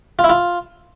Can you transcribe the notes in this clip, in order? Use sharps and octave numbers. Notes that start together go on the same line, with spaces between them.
F4
E4
F4